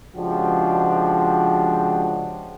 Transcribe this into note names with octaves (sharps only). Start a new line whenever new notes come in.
C#3 F3 G#3 D4 F#4 G4